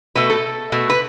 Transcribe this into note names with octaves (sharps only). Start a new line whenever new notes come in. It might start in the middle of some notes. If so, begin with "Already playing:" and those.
B2 A3 B4
A4
B2 A3
B4